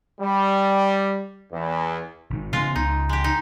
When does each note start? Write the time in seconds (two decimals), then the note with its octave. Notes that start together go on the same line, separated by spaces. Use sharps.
0.21 G3
1.52 E2
2.31 G#1 D#3
2.53 C#3 G#3 B3 F4
2.76 C#2 D#4
3.09 G#3 G4
3.24 D#4